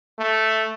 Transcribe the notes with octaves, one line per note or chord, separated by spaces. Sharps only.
A3